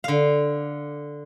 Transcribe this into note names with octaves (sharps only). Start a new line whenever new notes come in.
D3 F5